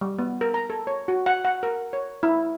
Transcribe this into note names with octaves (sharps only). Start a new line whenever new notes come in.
G3
B3
A#4
A#5
A4
C#5
F#4
F#5
F#5
A#4
C#5
E4